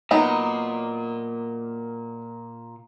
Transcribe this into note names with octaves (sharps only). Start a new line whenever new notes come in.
A#2 F#3 B3 D#4